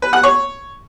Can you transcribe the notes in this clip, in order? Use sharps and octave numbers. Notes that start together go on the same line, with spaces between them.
B4
F#5
C#5